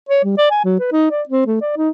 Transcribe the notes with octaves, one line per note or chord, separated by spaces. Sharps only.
C#5
G3
D5
G#5
F#3
B4
D#4
D5
C4
A3
D5
D#4